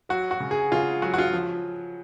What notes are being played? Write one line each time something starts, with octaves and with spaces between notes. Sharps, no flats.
F#3 F#4
F#4
C#3
G#4
C#3 F4
F#3 F#4
F#4
F4
F3